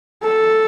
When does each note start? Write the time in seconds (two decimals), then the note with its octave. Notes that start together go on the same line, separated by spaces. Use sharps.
0.24 A4